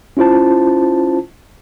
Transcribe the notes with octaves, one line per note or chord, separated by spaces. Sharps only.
C#4 E4 F4 C5 A5